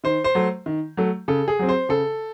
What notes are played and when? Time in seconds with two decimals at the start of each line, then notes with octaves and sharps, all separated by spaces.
0.04 D#3 C5
0.24 C5
0.35 F#3 A3
0.66 D#3
0.97 F#3 A3
1.28 C#3 A4
1.48 G#4
1.59 F#3 C4
1.69 C5
1.89 C#3 A4